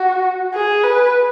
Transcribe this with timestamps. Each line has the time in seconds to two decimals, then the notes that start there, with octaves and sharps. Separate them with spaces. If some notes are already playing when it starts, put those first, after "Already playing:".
Already playing: F#4
0.54 G#4
0.83 B4